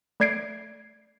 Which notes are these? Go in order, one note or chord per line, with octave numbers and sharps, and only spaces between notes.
A3 D5 G#6 C7 D7